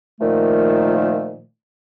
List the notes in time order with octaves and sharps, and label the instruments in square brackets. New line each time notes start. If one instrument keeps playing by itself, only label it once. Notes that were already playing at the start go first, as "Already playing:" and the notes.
[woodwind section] A#2 D#3 F3 A3